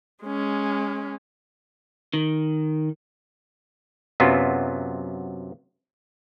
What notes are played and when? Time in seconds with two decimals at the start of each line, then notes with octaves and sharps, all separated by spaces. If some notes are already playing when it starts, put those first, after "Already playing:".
0.24 G#3 C#4
2.14 D#3
4.20 F#2 C3 F#3 B3 F4